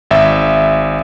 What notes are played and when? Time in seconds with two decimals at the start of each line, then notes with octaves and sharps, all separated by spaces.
0.11 G#1 E5